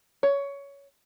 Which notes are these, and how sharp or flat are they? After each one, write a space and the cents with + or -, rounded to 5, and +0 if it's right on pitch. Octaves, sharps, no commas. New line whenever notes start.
C#5 +15